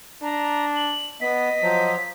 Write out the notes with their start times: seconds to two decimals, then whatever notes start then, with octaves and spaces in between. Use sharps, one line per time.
0.23 D4 A#5
0.76 F#7
1.21 B3 D#5 B6
1.62 F3 F#3